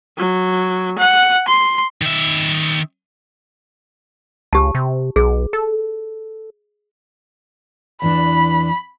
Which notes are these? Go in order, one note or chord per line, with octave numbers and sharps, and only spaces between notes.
F#3
F#5
C6
D#3 E5
C#2 G4 A5
C3
B1 G#4
A4
E2 E3 D4 B5